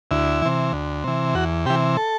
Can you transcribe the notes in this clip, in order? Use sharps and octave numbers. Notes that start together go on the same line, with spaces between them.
D2 E4
C3 E3
D2
C3 E3
E2 F#4
C3 E3 G4
A4